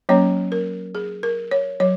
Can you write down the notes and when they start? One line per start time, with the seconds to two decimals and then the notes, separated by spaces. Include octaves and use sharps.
0.09 F#3 A#3 C#4 C#5
0.52 A#4
0.95 G#4
1.23 A#4
1.51 C#5
1.80 F#3 C#5